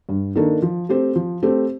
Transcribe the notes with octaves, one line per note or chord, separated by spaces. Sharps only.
G2
D#3 A#3 D4 A4
F3
A3 C4 G4 C5
F3
A3 C4 G4 C5